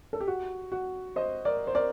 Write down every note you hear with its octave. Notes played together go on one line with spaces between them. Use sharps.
A4
G4
F#4
F#4
C5 D#5
A#4 D5
C5
A#4 D5